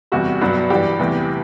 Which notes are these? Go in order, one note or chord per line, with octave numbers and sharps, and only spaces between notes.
E2 C3 G3 F#4
G2 F#3 B3 D4
G2 E3 G3 D4 G4
E2 C3 E3 A3